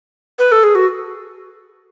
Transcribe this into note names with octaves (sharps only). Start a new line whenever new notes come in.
B4
A4
G#4
F#4